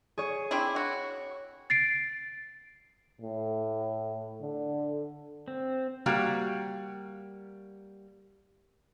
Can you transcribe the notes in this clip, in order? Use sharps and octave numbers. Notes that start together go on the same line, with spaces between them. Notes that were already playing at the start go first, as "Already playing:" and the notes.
G#4 C#5
C4 D4 E4
F#4
A6 C7 D7
A2
D3
C4
G3 A#3 F#4 F5 G5